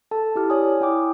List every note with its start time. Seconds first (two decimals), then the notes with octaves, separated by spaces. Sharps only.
0.11 A4 A5
0.35 E4 G4 F6
0.50 C#5 D5 G#5 D#6
0.81 E4 G5 G#5 D6